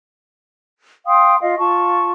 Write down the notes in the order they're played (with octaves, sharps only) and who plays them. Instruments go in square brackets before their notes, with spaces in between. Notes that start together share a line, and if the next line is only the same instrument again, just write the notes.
[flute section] F5 G5 C6 D#6
F4 D#5 F5
F4 A5 C#6